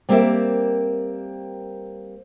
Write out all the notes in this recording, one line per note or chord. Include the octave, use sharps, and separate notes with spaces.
G3 A#3 C4 G4 A#4 E5